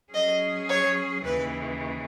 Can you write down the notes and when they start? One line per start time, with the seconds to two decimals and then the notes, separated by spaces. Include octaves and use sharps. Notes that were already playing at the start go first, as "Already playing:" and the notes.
0.13 F#3 C#4 G#4 D#5
0.69 C#5
1.24 D#2 C#3 E3 B4